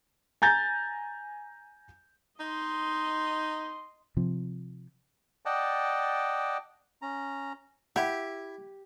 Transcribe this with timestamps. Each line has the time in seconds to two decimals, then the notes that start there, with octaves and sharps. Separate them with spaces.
0.42 G#5 A#5 G6 A6
2.40 D#4 D#5 C6
4.17 C3 F3
5.45 D5 D#5 F#5 G5 A5
7.02 C#4 A#5
7.96 E4 G4 E5 F#5